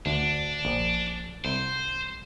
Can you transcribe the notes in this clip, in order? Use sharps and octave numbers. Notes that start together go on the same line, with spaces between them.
D2 D4
A#1
C2 C5